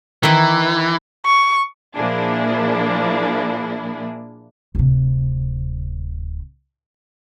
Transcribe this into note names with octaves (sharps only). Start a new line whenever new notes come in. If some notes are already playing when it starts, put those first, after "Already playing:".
D#3 E3 E4
C#6
A#2 F3 A#3 D4 E4 G#4
D1 C3